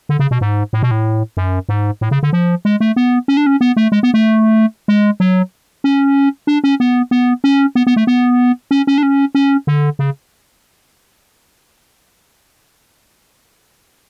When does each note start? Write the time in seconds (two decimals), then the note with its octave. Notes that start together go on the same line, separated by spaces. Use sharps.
0.09 D3
0.19 C#3
0.31 B2
0.41 G#2
0.73 A2
0.83 B2
0.91 A2
1.37 F#2
1.69 G#2
2.01 A2
2.11 C#3
2.23 D3
2.33 F3
2.65 G#3
2.80 A3
2.96 B3
3.28 C#4
3.37 D4
3.47 C#4
3.61 B3
3.77 A3
3.92 G#3
4.03 B3
4.14 A3
4.88 G#3
5.20 F#3
5.84 C#4
6.47 D4
6.64 C#4
6.80 B3
7.11 B3
7.44 C#4
7.75 B3
7.87 B3
7.96 A3
8.07 B3
8.71 C#4
8.87 C#4
8.98 D4
9.03 C#4
9.35 C#4
9.67 D3
9.99 C#3